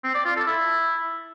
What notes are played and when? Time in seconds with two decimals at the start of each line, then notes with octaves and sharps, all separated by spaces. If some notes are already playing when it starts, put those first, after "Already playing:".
0.04 C4
0.15 D5
0.25 F4
0.36 A4
0.47 E4